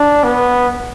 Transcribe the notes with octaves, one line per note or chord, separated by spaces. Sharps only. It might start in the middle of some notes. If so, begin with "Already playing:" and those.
Already playing: D4
B3